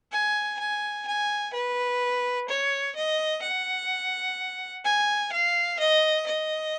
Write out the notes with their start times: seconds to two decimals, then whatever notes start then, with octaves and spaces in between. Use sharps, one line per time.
0.12 G#5
0.59 G#5
1.07 G#5
1.54 B4
2.49 C#5
2.96 D#5
3.43 F#5
4.85 G#5
5.33 F5
5.80 D#5
6.27 D#5